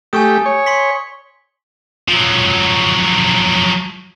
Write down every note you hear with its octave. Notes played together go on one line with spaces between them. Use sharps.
A3 G4 G#5 C#6 D#6
C#5
C6 C#6 B6
F3 F#3